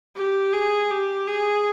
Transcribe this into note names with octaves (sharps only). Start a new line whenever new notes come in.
G4
G#4
G4
G#4